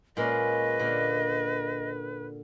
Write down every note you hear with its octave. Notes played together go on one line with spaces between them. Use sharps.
A#2 G#3 C#4 B4 D#5
A#2 D3